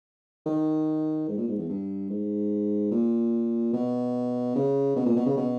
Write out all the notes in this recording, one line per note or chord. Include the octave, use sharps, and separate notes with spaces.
D#3
G#2
A#2
G#2
E2
G2
G#2
A#2
B2
C#3
B2
A#2
B2
C#3
B2